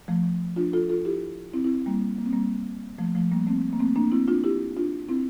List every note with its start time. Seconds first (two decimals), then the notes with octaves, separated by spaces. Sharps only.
0.08 F3 A3
0.56 D4 F4
0.73 F4 A4
0.89 F4 A4
1.05 E4 G4
1.53 C4 E4
1.64 C4 E4
1.86 G3 A#3
2.18 A#3
2.26 C4
2.33 G3 A#3
2.98 F3 A3
3.15 F3 A3
3.31 G3 A#3
3.47 A3 C4
3.73 A#3
3.79 A3 C4
3.96 A#3 D4
4.12 C4 E4
4.28 D4 F4
4.44 E4 G4
4.77 D4 F4
5.09 C4 E4